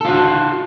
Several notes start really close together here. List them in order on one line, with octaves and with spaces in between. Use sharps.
A4 F4 F#4